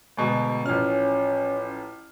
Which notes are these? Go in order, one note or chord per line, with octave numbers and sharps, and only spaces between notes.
D2 G#2 B2
A1 F3 C#4 F6